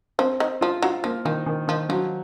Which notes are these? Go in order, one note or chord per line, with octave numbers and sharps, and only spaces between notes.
F3 C4
D#3
F3 F4
F#3 F4
F3 A#3
D#3 F3
D#3
D#3 F3
F3 F#3